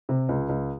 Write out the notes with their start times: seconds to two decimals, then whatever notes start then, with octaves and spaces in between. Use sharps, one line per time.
0.09 C3
0.29 C#2
0.49 C#2